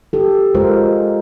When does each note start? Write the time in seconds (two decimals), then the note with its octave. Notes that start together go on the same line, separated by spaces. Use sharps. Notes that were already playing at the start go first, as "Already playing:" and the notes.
0.13 G4 A4
0.55 G#3 F4 A#4 C5